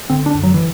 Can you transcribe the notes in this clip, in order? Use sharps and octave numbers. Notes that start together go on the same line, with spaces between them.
D3 C4
D4
F#2
F#3
E3